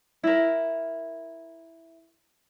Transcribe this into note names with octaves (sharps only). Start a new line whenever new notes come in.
E4 A#4